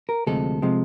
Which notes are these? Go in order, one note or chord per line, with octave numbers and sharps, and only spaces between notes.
A#4
D2 C3 F3 G#3 A4
C3 F3 G#3